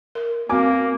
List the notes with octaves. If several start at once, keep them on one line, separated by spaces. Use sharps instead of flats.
A#4
A#3 C4 F#4 G#5 D6